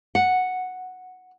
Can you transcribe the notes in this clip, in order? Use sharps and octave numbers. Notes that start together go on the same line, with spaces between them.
F#5